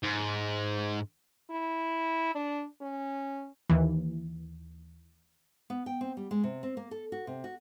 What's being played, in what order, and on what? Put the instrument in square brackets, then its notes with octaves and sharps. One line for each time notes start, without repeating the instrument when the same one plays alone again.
[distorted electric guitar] G#2
[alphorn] E4
D4
C#4
[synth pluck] D#2 E3
[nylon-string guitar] B3
G5
C4
G3
G#3
C3
C4
A#3
A4
F#4
C3
F#4